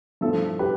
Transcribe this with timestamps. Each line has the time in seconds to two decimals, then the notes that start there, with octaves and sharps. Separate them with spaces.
0.21 G2 F3 A3 E4 A4
0.59 G4 B4